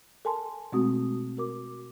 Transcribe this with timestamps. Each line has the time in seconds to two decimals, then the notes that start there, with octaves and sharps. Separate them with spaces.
0.25 A4 A#4 G#5 A5 C6
0.72 B2 G#3 A3 C4 F#4 D#6
1.37 F#4 A#4 D6